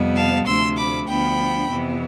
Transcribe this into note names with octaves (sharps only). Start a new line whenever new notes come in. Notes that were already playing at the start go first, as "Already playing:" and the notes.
Already playing: F2 C3 G3 B3
F5 A5
D2 C3 F3 A3 C6 E6
B5 D6
D2 D3 F3 B3 G5 B5
F2 C3 E3 B3